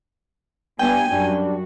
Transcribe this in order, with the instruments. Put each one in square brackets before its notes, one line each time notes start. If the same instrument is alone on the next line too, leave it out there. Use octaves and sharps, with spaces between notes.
[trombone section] G2 [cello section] B3 D4 [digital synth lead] G5 [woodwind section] G#5
[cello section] F#2 F#4 [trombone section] G3 D4